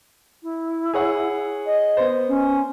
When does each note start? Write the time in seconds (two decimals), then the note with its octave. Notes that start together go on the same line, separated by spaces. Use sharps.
0.43 E4
0.94 G#4 C#5 F#5
1.66 D#5
1.97 B3 C5
2.28 C#4